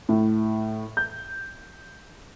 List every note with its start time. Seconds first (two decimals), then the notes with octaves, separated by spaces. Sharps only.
0.09 A2
0.97 G6